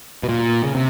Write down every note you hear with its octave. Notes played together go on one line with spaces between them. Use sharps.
B2
A#2
C#3
C3